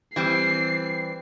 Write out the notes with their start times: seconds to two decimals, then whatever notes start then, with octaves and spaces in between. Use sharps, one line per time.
0.16 E3 G3 C4 C7